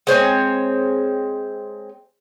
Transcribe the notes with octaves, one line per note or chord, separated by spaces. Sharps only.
G#3 C4 C#5 G#5